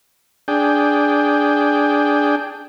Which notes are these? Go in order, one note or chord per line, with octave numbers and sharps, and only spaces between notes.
D4 G#4 G5